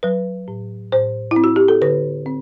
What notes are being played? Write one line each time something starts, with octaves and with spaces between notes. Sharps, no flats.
F#3 B4
A2
A2 C5
E4
C4
F#4
G4
A4
D3 B4
C4